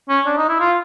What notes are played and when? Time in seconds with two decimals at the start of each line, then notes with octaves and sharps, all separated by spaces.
0.09 C#4
0.26 D4
0.37 D#4
0.49 E4
0.60 F4